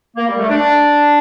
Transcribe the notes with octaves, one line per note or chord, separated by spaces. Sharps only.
A#3
G3
A3
D4